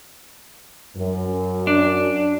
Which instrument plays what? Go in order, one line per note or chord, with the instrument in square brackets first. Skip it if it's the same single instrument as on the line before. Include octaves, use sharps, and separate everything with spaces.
[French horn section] F#2
[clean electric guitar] D4